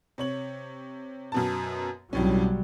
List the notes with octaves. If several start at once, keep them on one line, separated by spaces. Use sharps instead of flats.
C3 C#5 F#7
F#2 B2 A5
B1 F2 A2 F#3 G3 C#4